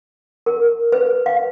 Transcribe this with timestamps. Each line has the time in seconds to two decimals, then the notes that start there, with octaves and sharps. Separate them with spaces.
0.46 A#4
0.92 B4
1.26 F5